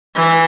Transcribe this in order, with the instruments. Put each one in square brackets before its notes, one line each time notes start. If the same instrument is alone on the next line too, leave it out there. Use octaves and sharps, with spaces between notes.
[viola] E3